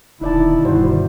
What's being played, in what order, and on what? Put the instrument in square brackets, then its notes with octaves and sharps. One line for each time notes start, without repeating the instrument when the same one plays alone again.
[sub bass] D#1 [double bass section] B2 D3 D#3 [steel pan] D#4 D5 A5 [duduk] E4
[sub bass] G2 [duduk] G3 [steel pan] E4 F#4 C5